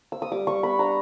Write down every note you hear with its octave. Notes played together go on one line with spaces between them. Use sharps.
E6
D#6
G3 D6
G3 C#6
B3 B5
D4 A#5